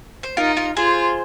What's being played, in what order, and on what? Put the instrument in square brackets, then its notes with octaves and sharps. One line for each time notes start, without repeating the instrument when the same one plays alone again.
[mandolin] C5
[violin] D#4 [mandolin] F4 A#4
[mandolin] F4 A#4
[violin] F4 [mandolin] G#4 C5